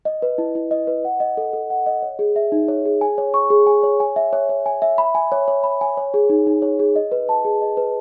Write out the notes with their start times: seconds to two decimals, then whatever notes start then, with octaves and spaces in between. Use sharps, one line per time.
0.05 D#5
0.22 B4
0.38 E4
0.55 E4
0.71 D#5
0.87 B4
1.05 F#5
1.20 D#5
1.37 A4
1.53 A4
1.70 F#5
1.86 D#5
2.02 C#5
2.19 G#4
2.36 E5
2.52 D#4
2.68 C#5
2.85 G#4
3.01 G#5
3.18 C#5
3.34 C#6
3.50 G#4
3.67 G#5
3.83 C#5
4.00 G#5
4.16 E5
4.33 C#5
4.49 C#5
4.66 G#5
4.82 E5
4.98 B5
5.15 G#5
5.32 C#5
5.48 C#5
5.64 B5
5.81 G#5
5.97 C#5
6.14 G#4
6.30 D#4
6.47 D#4
6.62 C#5
6.79 G#4
6.96 D#5
7.12 B4
7.29 A5
7.45 G#4
7.62 D#5
7.77 B4